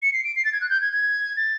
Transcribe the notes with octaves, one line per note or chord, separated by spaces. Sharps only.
C#7
C7
D7
C7
A6
G#6
F#6
G6
G#6
G#6
A6